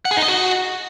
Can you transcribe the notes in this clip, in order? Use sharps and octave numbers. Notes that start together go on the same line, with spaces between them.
F#5
G#4
D#4
D#5
F#4